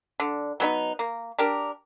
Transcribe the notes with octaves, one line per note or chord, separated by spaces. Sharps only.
D3
F#3 B3 D#4
A#3
D4 G4 A#4